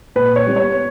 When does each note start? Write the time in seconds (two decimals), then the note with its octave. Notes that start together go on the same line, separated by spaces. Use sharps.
0.16 A#2 B4
0.36 C#5
0.46 G3 B3
0.56 C#5